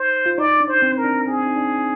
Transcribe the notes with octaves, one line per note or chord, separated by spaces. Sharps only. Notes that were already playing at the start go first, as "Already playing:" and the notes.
Already playing: D#4 C5
F4
D#4 D5
D4
C5
C4
A#4
D4
C4 G#4
D#4
D4